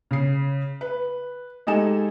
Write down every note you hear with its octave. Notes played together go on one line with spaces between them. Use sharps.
C#3 C7
B4
G#3 D#4 G4 A4 G#5 E7